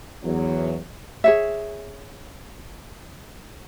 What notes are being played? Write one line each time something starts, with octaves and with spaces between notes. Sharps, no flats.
E2 F#3
G#4 C#5 E5